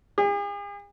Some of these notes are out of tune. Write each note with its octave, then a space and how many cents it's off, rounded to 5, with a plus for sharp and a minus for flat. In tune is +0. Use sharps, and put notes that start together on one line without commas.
G#4 -45